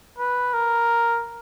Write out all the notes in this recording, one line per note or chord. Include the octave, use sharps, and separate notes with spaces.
B4
A#4